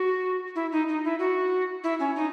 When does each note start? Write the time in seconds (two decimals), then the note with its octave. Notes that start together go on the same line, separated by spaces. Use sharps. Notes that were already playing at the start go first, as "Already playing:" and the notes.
Already playing: F#4
0.55 E4
0.72 D#4
0.88 D#4
1.04 E4
1.19 F#4
1.84 E4
2.00 C#4
2.16 D#4